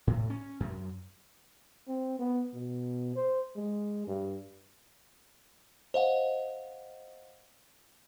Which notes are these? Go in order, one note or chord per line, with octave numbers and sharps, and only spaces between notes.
A2
C#4
F#2
C4
B3
B2
C5
G#3
G2
C5 D#5 F5 F#5